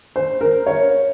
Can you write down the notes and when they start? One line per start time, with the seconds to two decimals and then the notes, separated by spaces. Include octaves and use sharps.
0.16 C5
0.41 A#4
0.66 C#5